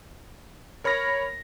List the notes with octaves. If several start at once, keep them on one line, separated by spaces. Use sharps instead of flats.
A#4 C#5 B5 F6 A#6